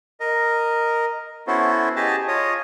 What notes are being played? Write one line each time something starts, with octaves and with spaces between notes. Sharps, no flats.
A#4 D#5
B3 C#4 E4 F#4 A4 C5
G4 G#4 D#5 A5
F4 C#5 D#5 D#6